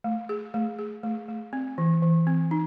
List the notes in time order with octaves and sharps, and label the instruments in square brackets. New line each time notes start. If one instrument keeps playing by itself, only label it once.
[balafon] A3
G#4
A3
G#4
A3
A3
C4
E3
E3
C4
D#4